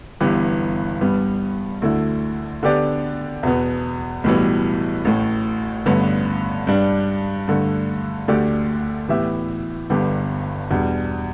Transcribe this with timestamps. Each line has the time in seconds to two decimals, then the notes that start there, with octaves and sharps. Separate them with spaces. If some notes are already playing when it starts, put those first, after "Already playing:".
0.20 G1 G2 E3 B3 G4
1.01 G2 G3 B3
1.82 D2 D3 A3 E4
2.63 D3 B3 D4 G4 D5
3.43 E2 B2 B3
4.24 B1 A2 E3 G3 B3
5.05 A1 A2 A3
5.86 A1 G2 D3 B3
6.67 G2 G3 D4
7.48 G2 D3 A3
8.28 D2 D3 A3 G4 D5
9.09 A2 E3 B3 G4 E5
9.90 G1 G2 D3 B3 G4
10.70 E2 B2 G3 D4